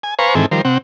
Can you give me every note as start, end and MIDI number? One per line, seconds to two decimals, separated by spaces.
0.03 0.14 80
0.19 0.35 71
0.19 0.35 72
0.19 0.35 77
0.19 0.35 80
0.19 0.35 82
0.19 0.35 85
0.35 0.46 44
0.35 0.46 51
0.35 0.46 52
0.35 0.46 60
0.35 0.46 69
0.35 0.46 80
0.51 0.61 51
0.51 0.61 53
0.51 0.61 55
0.51 0.61 70
0.51 0.61 72
0.65 0.78 48
0.65 0.78 60
0.65 0.78 78